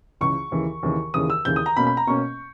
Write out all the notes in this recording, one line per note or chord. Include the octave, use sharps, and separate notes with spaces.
C#2 C#3 E3 C#6
D#2 C#3 E3
D#2 C#3 E3
D#2 C#3 E3 D#6
E6
D#2 C#3 E3 G6
D#6
A#5
B2 A#3 C#4 B5
B5
A#5
B2 A#3 C#4 C#6